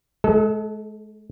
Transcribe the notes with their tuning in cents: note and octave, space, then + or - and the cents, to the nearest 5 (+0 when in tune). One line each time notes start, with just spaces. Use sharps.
G#3 +35 A4 -10